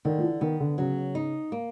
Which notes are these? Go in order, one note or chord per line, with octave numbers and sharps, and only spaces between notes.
D3 D#3
F3
E3
D#3 B3
D3
C#3 F#3
D#4
A#3